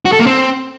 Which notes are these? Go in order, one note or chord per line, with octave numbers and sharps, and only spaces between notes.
F#4
A4
A#3
C4